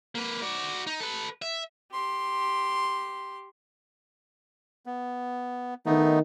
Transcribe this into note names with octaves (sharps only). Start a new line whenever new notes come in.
A#3 B4
F#4 D5
D#4
A4 B4
E5
G4 C6
B3
D#3 A3 B3 D#4